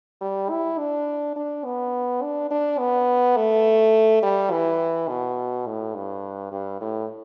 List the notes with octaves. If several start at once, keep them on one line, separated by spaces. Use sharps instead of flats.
G3
E4
D4
D4
B3
D4
D4
B3
A3
G3
E3
B2
A2
G2
G2
A2